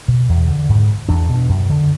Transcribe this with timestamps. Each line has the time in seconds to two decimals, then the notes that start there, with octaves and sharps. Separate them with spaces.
0.08 B2
0.29 E2
0.48 D3
0.69 G#2
1.09 E2 D4
1.29 B2
1.49 F#2
1.69 D3